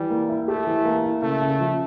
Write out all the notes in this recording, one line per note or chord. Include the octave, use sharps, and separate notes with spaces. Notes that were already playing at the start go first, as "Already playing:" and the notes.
Already playing: E3 G3
A#3
E4
A3 G4
E3
A#3
E4
C#3 A3
C#3
F3